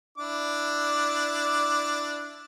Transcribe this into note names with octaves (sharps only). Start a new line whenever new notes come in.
D4 E4 D6